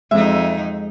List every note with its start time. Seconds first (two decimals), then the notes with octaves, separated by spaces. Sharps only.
0.11 F2 G#3 D#4 E5